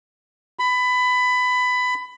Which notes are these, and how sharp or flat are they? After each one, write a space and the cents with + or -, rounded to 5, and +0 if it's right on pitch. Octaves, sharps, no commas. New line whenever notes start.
B5 +20